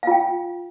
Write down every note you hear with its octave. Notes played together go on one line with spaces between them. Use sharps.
F4 F5 G5